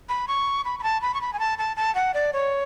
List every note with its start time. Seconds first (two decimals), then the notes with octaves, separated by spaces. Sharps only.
0.09 B5
0.28 C#6
0.65 B5
0.79 B5
0.83 A5
1.02 B5
1.14 C#6
1.21 B5
1.33 G#5
1.39 A5
1.58 A5
1.77 A5
1.95 F#5
2.14 D5
2.33 C#5